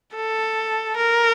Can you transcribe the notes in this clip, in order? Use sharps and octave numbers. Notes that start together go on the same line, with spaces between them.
A4
A#4